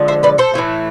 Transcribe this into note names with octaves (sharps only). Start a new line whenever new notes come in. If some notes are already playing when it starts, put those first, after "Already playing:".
Already playing: D3 F3 G#3
C5 E5
B4 D5
A4 C5
A2 E3 A3